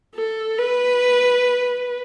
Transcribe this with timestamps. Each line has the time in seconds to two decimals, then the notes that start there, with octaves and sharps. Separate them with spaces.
0.15 A4
0.59 B4